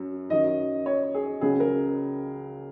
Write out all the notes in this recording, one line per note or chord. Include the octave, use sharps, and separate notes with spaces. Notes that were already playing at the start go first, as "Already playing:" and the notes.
Already playing: F#2 F#3
F#2 D#3 F#3 D#5
C#5
G#4
C#2 C#3 F#3 G#4
A#4